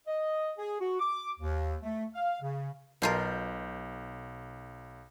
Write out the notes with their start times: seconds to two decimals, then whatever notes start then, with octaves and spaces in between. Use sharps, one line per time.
0.07 D#5
0.58 G#4
0.80 F#4
1.00 D6
1.39 D#2
1.83 A3
2.15 F5
2.41 C#3
3.02 B1 B2 F4 A#4 G6